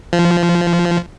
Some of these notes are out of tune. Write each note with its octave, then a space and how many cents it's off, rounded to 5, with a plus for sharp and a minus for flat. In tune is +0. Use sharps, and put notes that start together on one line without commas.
F3 -15